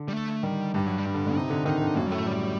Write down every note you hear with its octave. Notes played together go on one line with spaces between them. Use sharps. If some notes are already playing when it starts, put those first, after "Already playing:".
Already playing: D3
G3
A3
D#3 G3
G2 G3
F#3
G3
G2
D3
D3
C3 D#4
D3
D#3 D#4
D3
F#2 A#3
G3
A2 A3
G3